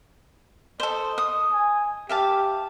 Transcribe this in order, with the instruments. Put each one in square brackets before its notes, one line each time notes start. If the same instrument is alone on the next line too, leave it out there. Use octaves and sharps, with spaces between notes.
[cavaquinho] A4 C5 [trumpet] D#5
[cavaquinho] D#6
[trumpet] G#5
[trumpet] G4 [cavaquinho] E5 F5 A5